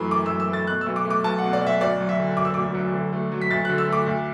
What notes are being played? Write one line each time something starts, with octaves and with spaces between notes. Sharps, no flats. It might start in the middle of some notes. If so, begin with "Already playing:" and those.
Already playing: F#2 E3 A3 B5
F#1 D6
F#2 E6
E6
A3 A6
B2 F#6
E6
B1
D6
A3
D6
B1 A5
F#5
B2
D5
B1
E5
D2 D5
F#3
E5
D3
E1 D6
E6
D2 D6
F#3
D3
A3
F#3
B6
D2 A6
D3 F#6
E6
A3 D6
D2